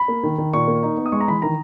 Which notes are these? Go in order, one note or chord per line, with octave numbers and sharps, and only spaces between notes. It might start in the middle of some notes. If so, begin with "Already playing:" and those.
Already playing: B5
A#3
D#3
D#3
A#2 C#6
A#3
D#4
B3
D#6
G#3 C#6
A#5
E3 B5
D#3 A#5